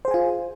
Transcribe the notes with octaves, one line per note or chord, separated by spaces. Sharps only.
F4 G#4 C5 G#5